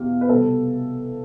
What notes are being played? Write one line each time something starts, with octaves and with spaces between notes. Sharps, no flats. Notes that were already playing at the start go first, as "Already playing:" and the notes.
Already playing: E2 B2 B3 G4 F5
B4
C2 B2 G3 A4